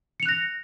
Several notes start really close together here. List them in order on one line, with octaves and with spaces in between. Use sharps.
C#7 F7 F#6 A#6